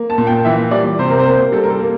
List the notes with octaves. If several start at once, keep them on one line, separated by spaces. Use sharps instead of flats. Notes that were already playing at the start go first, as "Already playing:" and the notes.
Already playing: A#3
A5
A#2
G5
E3 E5
G3 D5
C3 C5
A#4
C5
A#3
G3 A4
A#4
A4
A#3